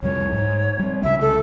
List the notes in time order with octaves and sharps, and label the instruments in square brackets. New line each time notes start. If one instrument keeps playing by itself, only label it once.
[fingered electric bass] C2 F2 G3 [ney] C#5
[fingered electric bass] G#2
G3 C4
[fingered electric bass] C2 C#3 [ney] E5
[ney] A4